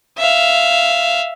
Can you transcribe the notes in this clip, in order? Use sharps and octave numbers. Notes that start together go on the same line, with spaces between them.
E5 F5